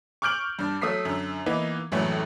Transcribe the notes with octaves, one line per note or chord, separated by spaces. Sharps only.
C#6 D6 F6 G6 D7 F#7
G2 D4
F#3 A3 D#6 E6 B6 C7
F#2 D3
E3 A#3 B3 D#4
A#1 F#2 A2 E3 F#3 A3